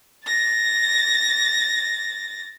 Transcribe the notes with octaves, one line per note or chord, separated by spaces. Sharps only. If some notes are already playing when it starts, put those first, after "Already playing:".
A6 A#6